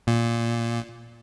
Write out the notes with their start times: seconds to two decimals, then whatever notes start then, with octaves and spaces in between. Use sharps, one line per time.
0.07 A#2